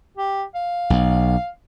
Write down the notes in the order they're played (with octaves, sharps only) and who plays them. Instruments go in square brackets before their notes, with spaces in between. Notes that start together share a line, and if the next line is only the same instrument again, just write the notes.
[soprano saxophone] G4
F5
[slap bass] B1